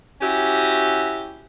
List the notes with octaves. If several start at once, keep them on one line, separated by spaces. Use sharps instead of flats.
C#4 E4 F#4 G4